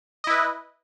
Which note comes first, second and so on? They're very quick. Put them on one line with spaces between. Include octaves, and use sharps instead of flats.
D#5 E4 B4